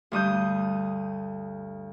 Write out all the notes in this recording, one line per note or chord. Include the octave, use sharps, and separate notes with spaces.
D2 G2 D#6 G6